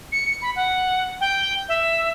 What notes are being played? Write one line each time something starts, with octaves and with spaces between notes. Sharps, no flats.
C#7
B5
F#5
G5
E5